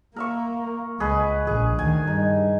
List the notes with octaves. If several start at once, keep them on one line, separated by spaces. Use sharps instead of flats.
A#3 A#4 E5 C#6
C#2 G#4 B4 D#5
A#1 G#4
D2 D#3 G#5
G2 D#4